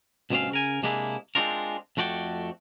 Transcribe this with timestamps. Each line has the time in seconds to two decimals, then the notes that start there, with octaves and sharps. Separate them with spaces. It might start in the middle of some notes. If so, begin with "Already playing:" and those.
0.30 D2 G2 B2 C4 C#4 F5
0.51 C#3 A#4 G#5
0.83 C3 G#3 A#3 D4 E4 G#4
1.35 G#3 C4 D4 F4 A#4
1.97 F2 A3 F#4 D5 G5